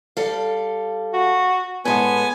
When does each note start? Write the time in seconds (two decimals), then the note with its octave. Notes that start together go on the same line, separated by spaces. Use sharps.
0.17 G3 A4 F5
1.13 F#4
1.85 A2 G#3 B3 G#5